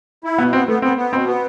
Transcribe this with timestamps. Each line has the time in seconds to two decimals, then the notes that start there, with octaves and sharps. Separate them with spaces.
0.24 E4
0.38 B2 B3
0.53 B3 C4
0.68 A3 B3
0.82 B3 C4
0.97 B3
1.12 B2 C4
1.27 B3